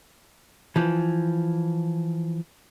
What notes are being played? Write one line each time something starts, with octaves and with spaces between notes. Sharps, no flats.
E3 F3